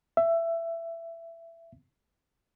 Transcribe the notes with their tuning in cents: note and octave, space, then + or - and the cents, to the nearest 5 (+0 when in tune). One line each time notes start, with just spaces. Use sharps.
E5 +20